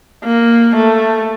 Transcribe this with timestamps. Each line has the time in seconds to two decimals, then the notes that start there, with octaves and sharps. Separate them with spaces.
0.24 A#3
0.76 A3